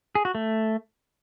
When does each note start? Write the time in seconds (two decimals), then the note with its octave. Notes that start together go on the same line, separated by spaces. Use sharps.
0.15 G#4
0.25 F#4
0.35 A3